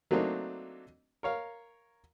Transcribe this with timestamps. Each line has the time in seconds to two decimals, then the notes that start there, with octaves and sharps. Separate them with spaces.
0.11 F#3 A3 A#3 C4 D4 D#4
1.23 A#4 C#5 F5